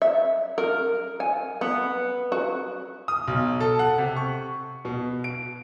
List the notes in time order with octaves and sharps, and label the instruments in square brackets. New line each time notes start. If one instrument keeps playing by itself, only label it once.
[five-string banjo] E5
A#4
G#5
B3
F#4
[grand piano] D#6
B1
A4
F#5
C3
C#6
B2
D7